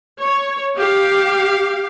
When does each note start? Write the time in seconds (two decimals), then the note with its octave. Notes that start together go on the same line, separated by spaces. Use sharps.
0.19 C#5
0.77 G4 F5